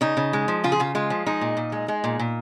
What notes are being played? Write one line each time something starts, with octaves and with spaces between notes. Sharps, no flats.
C#3 D#4
C#3
G#3
F3
C#3 F4
G#4
C#3 F4
G#3 F4
F3
G#3 D#4
A#2
A#2
G#3
G#3
A#2
A#2